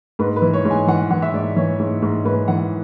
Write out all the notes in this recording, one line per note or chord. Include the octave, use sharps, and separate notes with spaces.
G#2 B4
B4
E3
C#5
G#2
G#5
E3 F#5
E3 F#5
E5
G#2 D5
E3 C#5
G#2
G#2
G#2 B4
E3 F#5